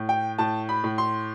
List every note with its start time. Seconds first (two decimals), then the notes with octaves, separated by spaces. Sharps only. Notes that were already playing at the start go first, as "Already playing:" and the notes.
Already playing: A2
0.09 G5
0.38 A2 A5
0.69 B5
0.84 A2
0.98 C6